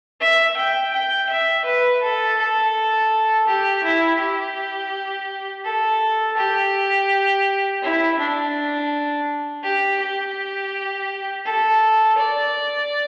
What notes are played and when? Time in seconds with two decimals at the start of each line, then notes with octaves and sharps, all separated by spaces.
0.21 E5
0.57 G5
0.93 G5
1.29 E5
1.65 B4
2.02 A4
2.38 A4
3.47 G4
3.83 E4
4.20 G4
5.64 A4
6.37 G4
7.82 E4
8.18 D4
9.63 G4
10.00 G4
11.45 A4
12.18 D5